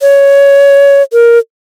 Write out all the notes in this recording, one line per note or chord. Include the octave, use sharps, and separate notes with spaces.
C#5
A#4